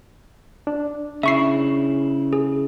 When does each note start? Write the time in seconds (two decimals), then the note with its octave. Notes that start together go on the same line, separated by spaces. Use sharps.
0.67 D4
1.23 C#3 E4 E5 C#6 C7
2.33 G#4